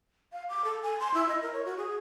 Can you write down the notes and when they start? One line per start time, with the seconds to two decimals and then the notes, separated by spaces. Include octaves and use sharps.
0.32 F5
0.49 D6
0.64 A4
0.82 G#5
1.00 C6
1.14 E4
1.29 D#5
1.42 A#4
1.53 C#5
1.65 F#4
1.77 G#4